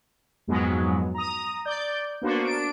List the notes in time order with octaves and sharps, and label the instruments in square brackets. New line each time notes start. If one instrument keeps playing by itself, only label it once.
[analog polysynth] F2 G#2 F#3 G#3 B3
A#5 D#6
D5 G6
A#3 B3 D4 F#4 C5
D4 D7